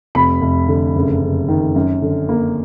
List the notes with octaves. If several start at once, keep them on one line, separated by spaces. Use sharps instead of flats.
F1 B5
F1
D3
F#1
F#1
D#3
F#2
D3
A#3